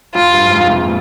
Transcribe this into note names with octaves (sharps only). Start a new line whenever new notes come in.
F2 F4
G2
G2
F2 G#2
G#2 C3
A#2